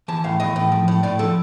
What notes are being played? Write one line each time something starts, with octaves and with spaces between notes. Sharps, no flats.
E3 A5
A2 F5
E3 D#5
A2
F3
A2
A2 D5
F3 A4